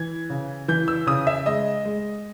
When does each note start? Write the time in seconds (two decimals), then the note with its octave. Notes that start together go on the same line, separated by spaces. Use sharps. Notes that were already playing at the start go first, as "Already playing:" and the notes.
Already playing: E3 G#6
0.30 C#3
0.68 E3 G6
0.88 E6
1.07 C#3 D#6
1.27 E5
1.46 G#3 D#5
1.85 G#3